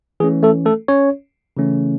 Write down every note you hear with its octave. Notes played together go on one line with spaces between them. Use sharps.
E3 A3 C#4 G#4
A3 A4
A3 A4
C#4 C#5
C#3 E3 A3 C#4